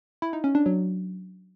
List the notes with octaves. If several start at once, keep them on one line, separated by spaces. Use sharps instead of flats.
E4
D#4
C#4
D4
F#3